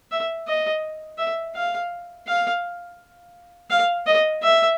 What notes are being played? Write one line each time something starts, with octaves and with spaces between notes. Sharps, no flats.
E5
D#5
E5
F5
F5
F5
D#5
E5